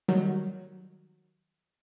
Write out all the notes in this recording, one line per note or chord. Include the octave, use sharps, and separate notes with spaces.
D#3 F#3 G3